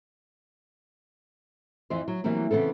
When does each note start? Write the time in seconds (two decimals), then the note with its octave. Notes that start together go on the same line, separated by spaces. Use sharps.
1.90 F2 E3 C4 C5
2.08 F#3
2.24 E3 F#3 G3 A#3 C4
2.51 C#3 E3 B3 C4 A4